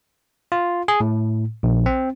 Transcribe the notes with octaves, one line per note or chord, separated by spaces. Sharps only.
F4
G#4
A2
A#1
C4